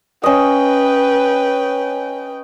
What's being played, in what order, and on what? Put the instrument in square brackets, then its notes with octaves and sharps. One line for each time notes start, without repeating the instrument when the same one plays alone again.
[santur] C#4 D#5 [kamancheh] B4 G5